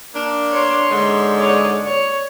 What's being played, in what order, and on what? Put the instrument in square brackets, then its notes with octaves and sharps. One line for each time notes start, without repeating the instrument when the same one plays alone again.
[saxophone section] A#3 D4
[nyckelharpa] C#5 C6
[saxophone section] G#2 D3 G#3
[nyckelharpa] C#5 D5
C#5 C#6